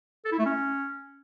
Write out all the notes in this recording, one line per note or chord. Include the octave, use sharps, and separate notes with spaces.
A4
E4
A3
C#4